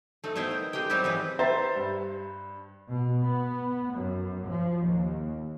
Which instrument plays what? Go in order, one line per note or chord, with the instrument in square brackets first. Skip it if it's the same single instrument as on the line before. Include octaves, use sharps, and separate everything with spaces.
[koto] A3 D#4
B3 D#4 E4 C5 G5
A#4
G#3 G4 A#4 G5
F#3 G3 C4 D#4 E4 G4
E3 D#4 B4
[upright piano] B4 C5 E5 A#5 A6
G2
[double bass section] B2
B3
F#2
F3
D#2